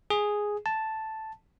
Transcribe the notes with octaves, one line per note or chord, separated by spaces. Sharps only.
G#4
A5